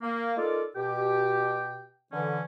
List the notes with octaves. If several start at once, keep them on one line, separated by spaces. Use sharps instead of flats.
A#3
D#4 F4 A4 A#4 D5
B2 G4 G5
D3 E3 C#4